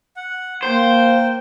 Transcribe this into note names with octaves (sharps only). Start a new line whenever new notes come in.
F#5
A#3 C5 G5